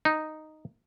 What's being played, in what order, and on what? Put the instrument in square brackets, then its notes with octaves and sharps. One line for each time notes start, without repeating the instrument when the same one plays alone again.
[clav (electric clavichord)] D#4